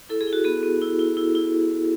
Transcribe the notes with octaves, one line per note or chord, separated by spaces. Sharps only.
E4 A4
G#4
E4
F#4
B3 G#4
B3
E4
E4
E4
E4